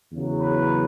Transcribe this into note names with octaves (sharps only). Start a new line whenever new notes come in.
E2 C#3 F#3
B4